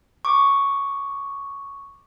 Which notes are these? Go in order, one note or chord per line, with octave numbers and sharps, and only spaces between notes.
C#6 D6